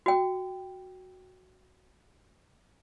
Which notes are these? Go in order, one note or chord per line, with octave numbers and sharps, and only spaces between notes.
F#4 G5